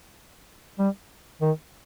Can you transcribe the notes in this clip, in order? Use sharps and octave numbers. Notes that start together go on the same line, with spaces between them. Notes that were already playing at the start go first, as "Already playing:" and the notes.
G3
D#3